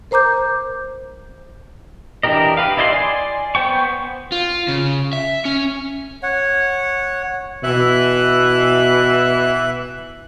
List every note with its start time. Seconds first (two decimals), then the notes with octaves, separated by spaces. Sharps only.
0.11 A#4 C5 A#5 D6 G6
2.23 E3 D4 G4 A#4 D#5
2.57 G4 B4 F5
2.77 E4 D5 D#5 G5 C6
2.92 D5 G#5 C6
3.55 B3 C5 G5 C#6
4.32 F4
4.68 C#3
5.13 E5
5.45 C#4
6.23 C#5 F#5
7.64 B2 E3 E5 F#6